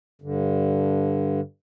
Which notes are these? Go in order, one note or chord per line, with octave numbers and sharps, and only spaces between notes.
G2 D3